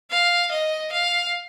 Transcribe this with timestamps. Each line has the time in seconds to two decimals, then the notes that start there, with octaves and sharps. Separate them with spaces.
0.11 F5
0.51 D#5
0.92 F5